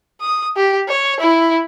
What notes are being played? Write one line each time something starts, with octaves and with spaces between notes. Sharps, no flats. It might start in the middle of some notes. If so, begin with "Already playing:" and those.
D#6
G4
C#5
E4